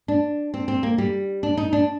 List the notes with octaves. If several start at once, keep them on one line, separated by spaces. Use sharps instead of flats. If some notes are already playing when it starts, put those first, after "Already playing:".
D4
C4
C4
A#3
G3
D4
D#4
D4